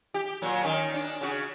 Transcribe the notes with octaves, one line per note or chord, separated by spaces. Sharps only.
G4
A#2 F#3
D#3 C#4
D4
C#3 F#4